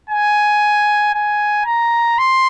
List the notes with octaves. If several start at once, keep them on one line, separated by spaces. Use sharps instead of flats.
G#5
G#5
A#5
C6